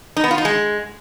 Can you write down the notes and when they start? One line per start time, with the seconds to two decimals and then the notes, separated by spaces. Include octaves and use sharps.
0.17 D#4
0.24 B3
0.31 F4
0.38 D#4
0.45 G#3